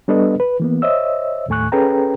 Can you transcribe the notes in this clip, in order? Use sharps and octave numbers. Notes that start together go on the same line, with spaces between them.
G3 B3 D4 A4 B4 D#5
B4
E3 A#3 B3
C5 C#5 D#5 E5 E6
D#2 A2 A3 G#5 C#6 F#6
C#4 G#4 A4 B4 G5 A#5